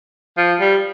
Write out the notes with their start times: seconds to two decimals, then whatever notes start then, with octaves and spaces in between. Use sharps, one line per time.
0.38 F3
0.60 G3